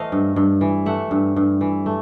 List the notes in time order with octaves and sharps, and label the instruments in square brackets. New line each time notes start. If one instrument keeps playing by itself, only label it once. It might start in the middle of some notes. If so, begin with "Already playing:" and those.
Already playing: [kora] E3 A3 C5 D#5 F5
G2
G2
E3
A3 E5 F#5
G2
G2
E3
A3